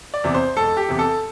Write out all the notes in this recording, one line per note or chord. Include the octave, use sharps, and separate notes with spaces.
D5
E2 C3
C5
E1 A4
G4
E2 C3
A4